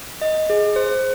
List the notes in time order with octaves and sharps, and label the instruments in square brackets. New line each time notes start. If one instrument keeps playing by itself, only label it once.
[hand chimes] D#5
G#4
C5